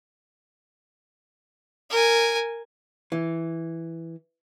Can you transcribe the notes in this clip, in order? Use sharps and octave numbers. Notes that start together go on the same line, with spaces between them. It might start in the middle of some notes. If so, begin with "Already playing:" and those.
A#4 G#5
E3